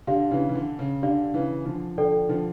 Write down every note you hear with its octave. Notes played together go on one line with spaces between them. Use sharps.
D3 D4 G4 D5 F5
C#3 E3
E3
D3
C#3
D3 D4 G4 D5 F5
C#3 E3
D3 F3
D3 F3 A4 D5 G5
D3 F3